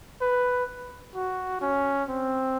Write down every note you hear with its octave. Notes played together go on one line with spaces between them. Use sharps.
B4
F#4
C#4
C4